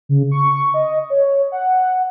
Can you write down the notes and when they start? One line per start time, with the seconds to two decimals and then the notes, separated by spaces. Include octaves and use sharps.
0.09 C#3
0.31 C#6
0.74 D#5
1.10 C#5
1.52 F#5